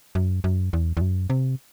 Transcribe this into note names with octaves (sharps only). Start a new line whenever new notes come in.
F#2
F#2
E2
E2
F#2
C3